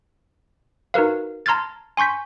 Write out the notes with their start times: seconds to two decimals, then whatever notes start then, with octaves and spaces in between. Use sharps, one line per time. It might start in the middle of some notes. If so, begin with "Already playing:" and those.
0.94 D#4 F#4 A#4 B4 F5
1.46 A5 A#5 C6 F6 G#6 A6
1.97 G#5 C6 C#6 G6 B6